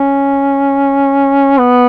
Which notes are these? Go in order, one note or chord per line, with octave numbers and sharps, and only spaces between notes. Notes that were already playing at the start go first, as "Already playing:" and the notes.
Already playing: C#4
B3